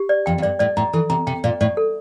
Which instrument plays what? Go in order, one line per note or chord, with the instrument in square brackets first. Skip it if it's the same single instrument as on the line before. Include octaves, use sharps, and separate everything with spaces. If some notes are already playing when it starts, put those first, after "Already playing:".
Already playing: [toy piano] G4
D5
[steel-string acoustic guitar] F2 [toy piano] G5
[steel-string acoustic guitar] F2
[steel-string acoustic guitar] G2 [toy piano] D5
[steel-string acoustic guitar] A2 [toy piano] D5
[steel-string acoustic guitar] A2 [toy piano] A#5
[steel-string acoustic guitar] E3 [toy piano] A4
[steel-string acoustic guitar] C3 [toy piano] A#5
[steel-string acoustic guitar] C3 [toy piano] G5
[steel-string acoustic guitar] A#2 [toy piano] D5
[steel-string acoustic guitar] A2 [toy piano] D5
[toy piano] A4